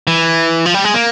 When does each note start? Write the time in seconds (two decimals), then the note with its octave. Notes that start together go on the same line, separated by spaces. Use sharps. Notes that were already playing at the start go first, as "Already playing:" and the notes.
0.07 E3
0.66 F3
0.74 G3
0.84 G#3
0.94 A#3